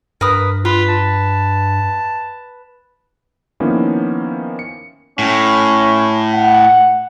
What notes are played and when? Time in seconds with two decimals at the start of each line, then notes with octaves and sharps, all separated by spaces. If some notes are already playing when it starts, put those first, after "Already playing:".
0.21 G2 A#4 B4 D#6
0.65 F4 B4
0.89 A5
3.60 D#3 F3 A#3 B3 C#4 E4
4.59 C#7
5.19 A2 C#4
6.33 F#5